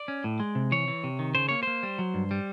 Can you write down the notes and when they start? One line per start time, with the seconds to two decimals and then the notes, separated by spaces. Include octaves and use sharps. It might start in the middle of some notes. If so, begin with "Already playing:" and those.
Already playing: D5
0.08 C#4
0.24 A2
0.40 G#3
0.55 C3
0.72 E3 C#5
0.88 E3
1.04 C3
1.19 D#3
1.35 C#3 C5
1.49 A#3 C#5
1.63 A#3 C5
1.83 G3
1.99 F#3
2.14 G2
2.31 G3